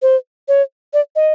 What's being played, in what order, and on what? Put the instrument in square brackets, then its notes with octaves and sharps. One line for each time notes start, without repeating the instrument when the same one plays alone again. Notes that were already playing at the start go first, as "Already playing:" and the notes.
[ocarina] C5
C#5
D5
D#5